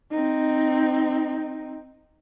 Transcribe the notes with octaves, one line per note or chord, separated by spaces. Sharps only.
C4 D#4